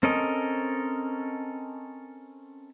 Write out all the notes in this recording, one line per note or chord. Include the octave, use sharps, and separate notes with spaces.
C4 C#4 A4 A#4 D#5